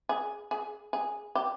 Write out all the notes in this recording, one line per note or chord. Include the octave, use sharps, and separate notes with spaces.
G#4
G#4
G#4
G4